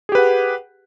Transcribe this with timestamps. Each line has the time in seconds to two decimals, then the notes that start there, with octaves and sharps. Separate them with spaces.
0.09 G#4
0.12 G4
0.15 B4
0.18 F#5